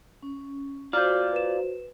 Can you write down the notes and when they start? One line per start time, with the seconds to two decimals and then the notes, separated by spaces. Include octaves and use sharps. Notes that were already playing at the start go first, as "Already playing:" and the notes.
0.23 C#4
0.93 F4 F#4 C5 D5 F6 G6
1.33 B4 E7